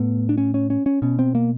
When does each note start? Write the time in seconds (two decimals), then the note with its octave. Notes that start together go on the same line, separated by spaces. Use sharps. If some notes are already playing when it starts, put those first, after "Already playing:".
Already playing: A2 B3
0.29 D4
0.38 C#4
0.54 C#4
0.70 C#4
0.86 C#4
1.02 B2 C#4
1.19 C4
1.35 A#3